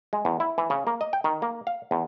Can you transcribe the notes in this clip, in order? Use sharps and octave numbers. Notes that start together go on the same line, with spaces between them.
G#3
E2
E4
E3
C#3
A#3
D#5
G5
D#3
A#3
F5
E2